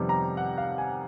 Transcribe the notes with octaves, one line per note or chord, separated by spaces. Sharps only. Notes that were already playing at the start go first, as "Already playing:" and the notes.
Already playing: F2 C3 D#3 G3 B3
A#5
F#5
F5
G#5